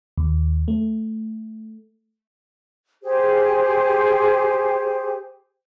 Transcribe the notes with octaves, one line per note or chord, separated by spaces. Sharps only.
D#2
A3
G4 G#4 C5